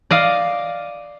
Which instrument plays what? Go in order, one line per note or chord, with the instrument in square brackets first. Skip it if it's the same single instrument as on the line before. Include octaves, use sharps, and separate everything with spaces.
[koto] D5 D#5 F5